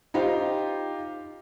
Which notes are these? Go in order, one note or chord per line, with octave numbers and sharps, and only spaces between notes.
D#4 F4 G4 C5